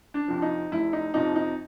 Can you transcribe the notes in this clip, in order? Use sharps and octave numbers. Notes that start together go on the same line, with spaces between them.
D4
F2 C3 F3
D#4
F1 E4
D#4
F2 C3 F3 D#4
D#4